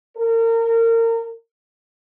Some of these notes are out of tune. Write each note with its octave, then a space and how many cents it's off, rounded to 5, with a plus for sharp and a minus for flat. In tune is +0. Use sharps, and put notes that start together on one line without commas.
A#4 -30